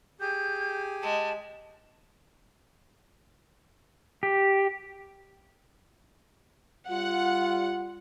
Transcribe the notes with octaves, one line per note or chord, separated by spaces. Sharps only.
G4 G#4 G6
G#3 A5
G4
G3 F4 F#5